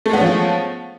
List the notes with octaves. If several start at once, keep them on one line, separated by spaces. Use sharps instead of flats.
F3 G#3 A3 B3 C#4